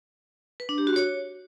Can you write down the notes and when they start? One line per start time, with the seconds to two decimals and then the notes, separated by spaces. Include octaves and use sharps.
0.60 B4
0.69 D4
0.78 G4
0.87 F#4
0.96 C#5